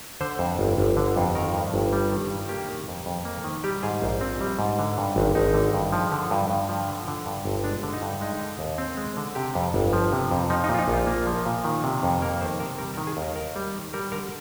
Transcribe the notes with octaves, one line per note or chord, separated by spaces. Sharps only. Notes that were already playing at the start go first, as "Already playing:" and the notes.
D3 C5
F2
G1
G1
D3
F2
D#3 A#4
G2
G1
G3
D#3
G2
A#3 G4
D#3
F2
F2
A#3
D#3
G3 G4
G#2 G#4
A#1 C5
C4
G3
G#2
D3
G2
G#1
G#1 D#4
D3
G2
F3
D3
G2
G2
F3
D3
D3
G2
G1
G#3 D4
D3
D#4
G2
G#3 D#4
D3
D#2
C4
G#3
D3
C3 G4
F2
G1
F3
C3
F2
F3 D#4
D#4
A#2
F4
D#4
A#1
F4
A#3
F3
A#2
D#3
C3
F2
A#3 A#4
D#3 C5
C3 A#4
G3 A#4
A#4
D#3
G#4
D#2
A#4
D#2 A#4
G3
D#3
G3 A#4
D3 A#4